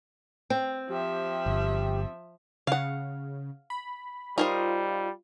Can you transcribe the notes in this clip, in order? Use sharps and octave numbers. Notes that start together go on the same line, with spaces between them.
C4
F3 G4 E5
G1
C#3 F5 F#5
B5
G3 D#4 F4 A#4 C5